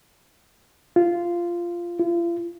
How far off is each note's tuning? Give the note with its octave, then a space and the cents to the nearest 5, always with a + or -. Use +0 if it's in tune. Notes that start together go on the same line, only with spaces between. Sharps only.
F4 -10
F4 -40